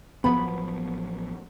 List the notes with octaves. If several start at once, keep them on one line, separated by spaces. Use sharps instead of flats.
A1 F3 F#3 B3 B5